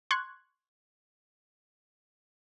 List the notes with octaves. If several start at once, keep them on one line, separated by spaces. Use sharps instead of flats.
C6 C#6 F#6 G#6